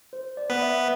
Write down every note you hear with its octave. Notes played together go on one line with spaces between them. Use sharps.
C5
D5
B3 B4
E5